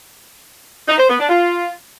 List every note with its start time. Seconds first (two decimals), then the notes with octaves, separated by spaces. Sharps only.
0.88 D#4
0.98 C5
1.09 B3
1.19 D4
1.29 F4